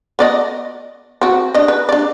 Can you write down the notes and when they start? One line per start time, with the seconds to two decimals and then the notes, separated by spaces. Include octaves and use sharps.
0.19 B3 D5 D#5
1.21 C4 F#4
1.54 D4 D#5
1.68 B4
1.89 D4 D5